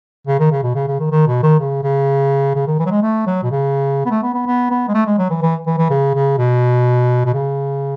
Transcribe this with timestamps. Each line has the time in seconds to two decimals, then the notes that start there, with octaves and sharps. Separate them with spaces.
0.27 C#3
0.39 D#3
0.52 C#3
0.63 B2
0.75 C#3
0.88 C#3
1.00 D#3
1.11 D#3
1.27 B2
1.43 D#3
1.59 C#3
1.83 C#3
2.55 C#3
2.67 D#3
2.79 E3
2.86 F#3
2.91 G#3
3.03 A3
3.27 F#3
3.44 B2
3.51 C#3
4.06 B3
4.11 A3
4.23 B3
4.34 B3
4.47 B3
4.71 B3
4.88 G#3
4.94 A3
5.06 G#3
5.18 F#3
5.30 E3
5.42 E3
5.66 E3
5.78 E3
5.90 C#3
6.14 C#3
6.38 B2
7.25 B2
7.34 C#3